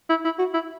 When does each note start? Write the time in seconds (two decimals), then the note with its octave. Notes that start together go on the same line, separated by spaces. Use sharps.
0.10 E4
0.25 E4
0.39 F#4
0.54 E4